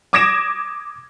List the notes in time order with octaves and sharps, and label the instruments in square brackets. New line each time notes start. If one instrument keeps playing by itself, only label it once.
[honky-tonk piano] D6 D#6 G#6 A#6 D7 E7